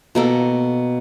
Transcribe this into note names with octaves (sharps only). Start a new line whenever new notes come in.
B2 A#3 A4